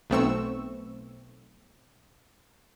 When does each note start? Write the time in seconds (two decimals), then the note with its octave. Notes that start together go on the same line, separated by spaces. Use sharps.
0.10 B1 A3 B3 C4 C#6 E6